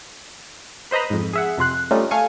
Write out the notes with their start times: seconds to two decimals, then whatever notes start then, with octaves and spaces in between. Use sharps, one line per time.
0.91 B4 C5 D#5 A#5 B5
1.10 F2 G#2
1.33 G#4 E5 F#5
1.58 F2 C3 C6 F#6
1.91 G3 A3 C#4 D#4 F4
2.11 A3 F5 G#5 C#7